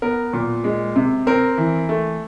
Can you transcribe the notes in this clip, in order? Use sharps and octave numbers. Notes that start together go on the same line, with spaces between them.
B3 A#4
A#2
G#3
C3
C4 A#4
E3
A3